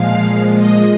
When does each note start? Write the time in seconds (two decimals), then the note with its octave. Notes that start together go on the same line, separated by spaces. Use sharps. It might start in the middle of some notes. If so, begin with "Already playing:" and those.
Already playing: A#2 F3 G#3 F5
0.54 D#5